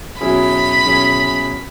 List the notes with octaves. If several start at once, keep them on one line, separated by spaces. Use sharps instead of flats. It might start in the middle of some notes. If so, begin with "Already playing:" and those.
B2 F#3 C#4 E4 G#4 B5
B2 F#3 C#4 E4 G#4